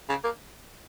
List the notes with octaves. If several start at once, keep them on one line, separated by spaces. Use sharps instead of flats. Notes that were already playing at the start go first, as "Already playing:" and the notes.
C#3
A#3